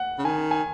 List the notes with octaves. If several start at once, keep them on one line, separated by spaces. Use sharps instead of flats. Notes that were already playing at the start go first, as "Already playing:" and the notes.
Already playing: F#5
C#3
D#3 G#5
G#5